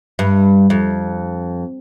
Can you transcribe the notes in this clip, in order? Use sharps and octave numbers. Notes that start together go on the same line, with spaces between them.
G2
F2